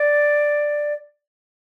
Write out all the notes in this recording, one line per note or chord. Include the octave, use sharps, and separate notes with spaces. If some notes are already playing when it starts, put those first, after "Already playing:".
Already playing: D5